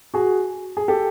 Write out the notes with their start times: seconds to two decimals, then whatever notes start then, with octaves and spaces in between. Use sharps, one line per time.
0.14 F#4 G#4
0.77 G#4
0.88 G4 A4